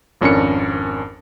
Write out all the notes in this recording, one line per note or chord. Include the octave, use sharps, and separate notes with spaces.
G#1 F2 C#4 D4 A#4 C#7